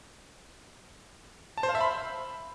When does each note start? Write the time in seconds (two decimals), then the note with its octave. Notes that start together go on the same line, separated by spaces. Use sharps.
1.58 A5
1.63 C5
1.69 F5
1.75 E5
1.81 B5